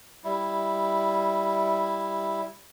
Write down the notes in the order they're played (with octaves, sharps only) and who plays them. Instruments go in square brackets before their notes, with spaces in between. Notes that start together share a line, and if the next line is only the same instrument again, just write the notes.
[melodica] G3 E4